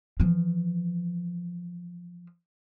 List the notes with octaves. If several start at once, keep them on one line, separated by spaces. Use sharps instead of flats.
E3 F3